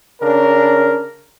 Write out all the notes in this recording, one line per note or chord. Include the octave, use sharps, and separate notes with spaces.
C#3 D4 A#4